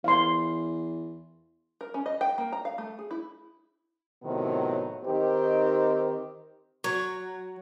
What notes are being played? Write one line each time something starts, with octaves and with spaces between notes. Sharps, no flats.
E2 F5 C6
A#4
C#4
D#5
G5
A#3
A#5
F5
A3
G#4
E4
A2 C3 D#3 F#3 B3
D#3 C4 D#4 G4
F#3 C#5